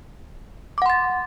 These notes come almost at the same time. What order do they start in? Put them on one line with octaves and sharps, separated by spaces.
D6 F#5 C6 A6